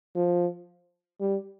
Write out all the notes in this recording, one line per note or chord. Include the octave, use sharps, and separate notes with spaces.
F3
G3